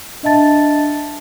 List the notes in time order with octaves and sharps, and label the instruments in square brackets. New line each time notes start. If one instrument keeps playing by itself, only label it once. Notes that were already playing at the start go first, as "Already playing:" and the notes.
[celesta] D4 D#5 E5 A5 A6